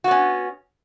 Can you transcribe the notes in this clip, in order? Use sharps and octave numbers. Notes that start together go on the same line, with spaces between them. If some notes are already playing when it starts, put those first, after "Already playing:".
B3 C#4 F#4